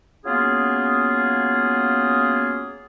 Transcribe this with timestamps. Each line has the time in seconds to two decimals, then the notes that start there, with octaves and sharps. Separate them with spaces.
0.25 F#3 A#3 B3 C#4 F4 G#4